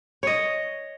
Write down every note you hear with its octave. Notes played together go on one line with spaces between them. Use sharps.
C#5 D#5